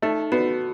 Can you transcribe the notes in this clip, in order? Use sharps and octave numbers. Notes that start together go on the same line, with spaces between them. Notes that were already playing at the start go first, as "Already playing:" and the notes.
A3 D#4
B3 F#4